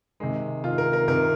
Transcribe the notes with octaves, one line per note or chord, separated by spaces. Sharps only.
C3 D#3 G#3
C3 D#3 F4
A#4
A#4
C3 D#3 A#4